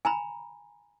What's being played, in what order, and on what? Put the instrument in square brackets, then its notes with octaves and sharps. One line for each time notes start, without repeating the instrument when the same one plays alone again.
[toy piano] G#5 A#5 B5